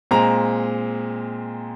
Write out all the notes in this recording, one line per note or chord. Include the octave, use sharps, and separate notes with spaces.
A#2 G#3 C4 A#5